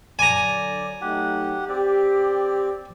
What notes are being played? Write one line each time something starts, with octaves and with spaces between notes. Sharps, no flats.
D3 F#3 D5 G#5 A#5
F#3 A3 D#4 G4 F#5
C4 G4 D5